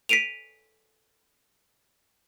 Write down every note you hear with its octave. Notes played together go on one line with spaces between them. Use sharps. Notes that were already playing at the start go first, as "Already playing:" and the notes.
B6 C7 D7 D#7 F7